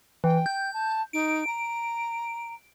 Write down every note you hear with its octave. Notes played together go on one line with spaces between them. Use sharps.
E3 G5
G6
A5
D#4 D7
A#5